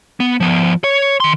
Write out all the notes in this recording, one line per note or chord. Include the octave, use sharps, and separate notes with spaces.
B3
F3 B3
C#5
D#3 C6